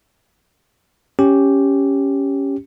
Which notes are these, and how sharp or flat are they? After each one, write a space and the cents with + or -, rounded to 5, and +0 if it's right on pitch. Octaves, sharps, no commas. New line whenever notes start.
C#4 +0 G4 +0